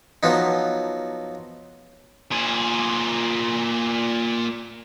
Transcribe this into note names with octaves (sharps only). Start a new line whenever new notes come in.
F3 F#3 B3 D#4
A#2 G#4